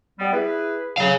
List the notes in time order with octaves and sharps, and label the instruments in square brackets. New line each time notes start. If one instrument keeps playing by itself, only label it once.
[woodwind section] G3 B3
E4 G#4 B4
[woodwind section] A2 C#3 F#3 [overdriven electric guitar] G#4 F5